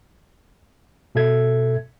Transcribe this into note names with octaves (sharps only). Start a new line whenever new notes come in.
B2 A4 E5 G#6